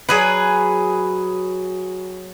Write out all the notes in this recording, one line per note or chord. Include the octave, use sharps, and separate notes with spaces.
F#3 G#4 B4